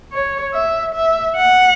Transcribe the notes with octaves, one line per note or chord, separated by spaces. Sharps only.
C#5
E5
E5
F#5